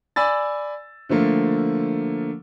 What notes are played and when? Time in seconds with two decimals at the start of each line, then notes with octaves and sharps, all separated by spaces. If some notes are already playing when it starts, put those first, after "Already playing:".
0.16 D5 G#5 B5 E6 A6
1.09 D3 F3 A3 A#3